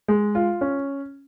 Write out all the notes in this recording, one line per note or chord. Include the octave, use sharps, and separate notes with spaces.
G#3
F4
C#4